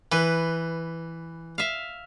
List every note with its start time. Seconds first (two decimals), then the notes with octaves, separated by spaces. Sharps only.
0.12 E3 B4
1.58 E5 F5